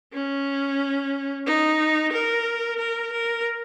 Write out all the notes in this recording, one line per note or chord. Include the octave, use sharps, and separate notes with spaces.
C#4
D#4
A#4
A#4
A#4